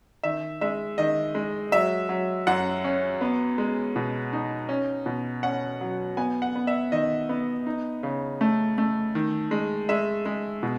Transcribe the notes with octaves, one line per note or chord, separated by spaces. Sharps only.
D#3 E5
G#3 E5
D#3 D#5
G#3
F#3 E5
F#3
F#2 F#5
C#4
B3
G#3
B2
D#4
C#4
B2
C#4 F#5
F#3
B3 G#5
F#5
B3
E5
D#3 D#5
B3
D#4
C#3
A3
A3
D#3
G#3
G#3 E5
G#3
B2